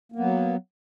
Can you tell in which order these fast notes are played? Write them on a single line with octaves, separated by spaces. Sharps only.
A#3 B3 F#3